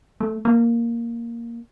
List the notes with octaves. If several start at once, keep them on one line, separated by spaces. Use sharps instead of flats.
A3
A#3